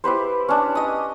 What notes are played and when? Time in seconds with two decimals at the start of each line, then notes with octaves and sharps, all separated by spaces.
0.04 E4 G4 B4 C5
0.48 C#4 D4
0.75 D#5 D#6